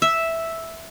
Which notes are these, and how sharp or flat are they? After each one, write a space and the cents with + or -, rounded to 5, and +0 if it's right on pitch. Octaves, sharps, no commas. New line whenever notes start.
E5 -5